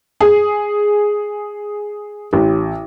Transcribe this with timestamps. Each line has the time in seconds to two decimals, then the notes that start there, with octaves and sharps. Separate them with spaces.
0.21 G#4
2.33 A1